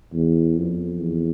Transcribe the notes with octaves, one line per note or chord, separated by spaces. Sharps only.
E2
F2
E2